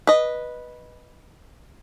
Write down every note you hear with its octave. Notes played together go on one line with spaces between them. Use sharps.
B4 D#5